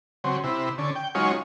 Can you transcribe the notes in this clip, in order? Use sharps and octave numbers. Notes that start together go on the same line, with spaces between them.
C#3 F#3 C4
C3 E4
D3 C#4
G5
F#3 G#3 C#4 D#4 F4 C#5